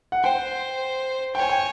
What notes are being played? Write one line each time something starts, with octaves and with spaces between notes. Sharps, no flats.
F#5
C5 G5
C#5 G5
G#5
G5